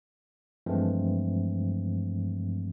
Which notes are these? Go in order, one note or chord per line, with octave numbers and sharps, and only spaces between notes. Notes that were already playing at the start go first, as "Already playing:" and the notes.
G2 E3 F3 G#3 A3 C4